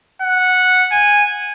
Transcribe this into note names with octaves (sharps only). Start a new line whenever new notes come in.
F#5
G#5